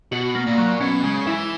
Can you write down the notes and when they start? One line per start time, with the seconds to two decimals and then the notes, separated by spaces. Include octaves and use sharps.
0.12 B2 F#4
0.35 A#3
0.47 A#2
0.58 F#3
0.80 B2 C#4
1.03 C#3 G#3
1.26 E3 E4